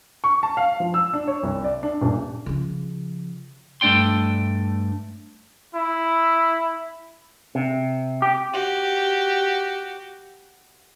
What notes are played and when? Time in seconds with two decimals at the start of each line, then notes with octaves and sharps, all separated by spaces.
0.24 C#6
0.43 A5
0.57 F5
0.80 F3
0.94 E6
1.13 D4
1.27 C#5
1.43 C2
1.64 D5
1.83 D4
2.02 D#1
2.46 C#3 F3
3.81 G2 A3 D4 D5 G5 C6
5.75 E4
7.55 C3
8.22 G4
8.53 F#4 G4